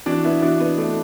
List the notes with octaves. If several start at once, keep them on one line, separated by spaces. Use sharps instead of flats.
E3 D4 F#4
B3 E4
E3 D4 F#4
B3 E4
A3 D4